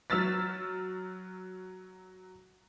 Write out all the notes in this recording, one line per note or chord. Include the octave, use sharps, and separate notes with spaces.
F#3 E6 F6 A6 B6